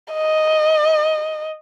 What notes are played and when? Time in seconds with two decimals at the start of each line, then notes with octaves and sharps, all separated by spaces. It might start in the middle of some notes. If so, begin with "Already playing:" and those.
0.13 D#5